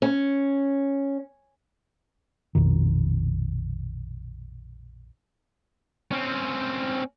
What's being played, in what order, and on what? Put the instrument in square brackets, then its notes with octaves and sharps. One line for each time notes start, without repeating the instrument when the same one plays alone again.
[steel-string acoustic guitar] C#4
[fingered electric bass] A#1 F2 B2 D#3
[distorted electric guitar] C4 C#4